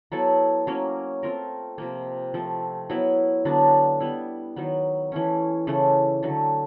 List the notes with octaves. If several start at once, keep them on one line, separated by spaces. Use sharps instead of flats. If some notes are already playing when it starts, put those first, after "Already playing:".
F#3 B3 E4 A4
F#3 A#3 C#4
A3 C4 F4 A#4
C3 F3 A#3
F3 A3 C4
F#3 B3 E4
D3 F#3 B3 D4
G3 B3 E4
D#3 F#3 B3
E3 A3 C#4
C#3 E3 A3
D3 F#3 A3